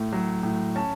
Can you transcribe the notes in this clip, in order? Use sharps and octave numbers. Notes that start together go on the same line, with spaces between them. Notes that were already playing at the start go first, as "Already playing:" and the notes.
Already playing: A2 A3
F#3
A2
C#4 A5